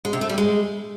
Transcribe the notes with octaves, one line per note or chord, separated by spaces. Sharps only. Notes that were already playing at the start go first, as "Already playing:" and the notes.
G#3
C3
A3
G3
G#3